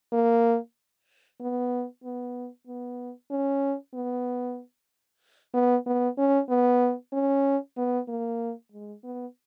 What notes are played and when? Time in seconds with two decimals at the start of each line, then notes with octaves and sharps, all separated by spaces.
0.12 A#3
1.40 B3
2.03 B3
2.67 B3
3.31 C#4
3.94 B3
5.54 B3
5.86 B3
6.18 C#4
6.49 B3
7.13 C#4
7.77 B3
8.08 A#3
8.72 G#3
9.04 B3